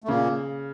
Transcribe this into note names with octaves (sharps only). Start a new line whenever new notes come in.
A3
A#2 C#3 A#3